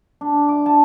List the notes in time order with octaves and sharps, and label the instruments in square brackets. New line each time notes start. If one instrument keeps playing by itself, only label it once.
[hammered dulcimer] D4
D6
A5